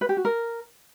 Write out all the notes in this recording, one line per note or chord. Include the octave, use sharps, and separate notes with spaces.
B4
G4
F#4
A#4